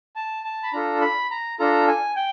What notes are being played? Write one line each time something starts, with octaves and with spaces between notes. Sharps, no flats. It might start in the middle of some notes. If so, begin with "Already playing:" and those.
A5
A5
B5
D4 F4 A4 A#5
B5
A#5
D4 F4 A4 A#5
G#5
G5